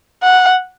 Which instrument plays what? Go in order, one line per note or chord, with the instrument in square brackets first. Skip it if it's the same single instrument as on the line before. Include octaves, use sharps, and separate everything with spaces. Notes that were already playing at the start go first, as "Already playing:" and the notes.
[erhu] F#5